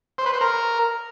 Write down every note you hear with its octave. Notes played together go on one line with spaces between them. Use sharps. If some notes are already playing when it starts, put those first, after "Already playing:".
C5
B4
C5
A#4